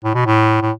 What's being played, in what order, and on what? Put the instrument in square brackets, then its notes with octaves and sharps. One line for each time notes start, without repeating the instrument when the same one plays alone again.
[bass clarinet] A2
B2
A2
A2